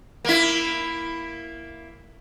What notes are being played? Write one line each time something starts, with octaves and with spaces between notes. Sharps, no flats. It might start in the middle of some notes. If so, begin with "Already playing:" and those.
A#3 E4